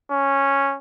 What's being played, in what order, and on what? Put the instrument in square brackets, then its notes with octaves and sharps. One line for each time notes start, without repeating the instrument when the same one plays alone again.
[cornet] C#4